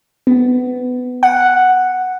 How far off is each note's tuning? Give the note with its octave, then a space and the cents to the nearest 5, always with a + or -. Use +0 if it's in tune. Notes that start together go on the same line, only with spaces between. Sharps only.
B3 +20
F#5 +0